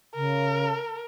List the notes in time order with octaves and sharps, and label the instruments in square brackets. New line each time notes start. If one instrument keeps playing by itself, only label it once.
[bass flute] C#3 [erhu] A#4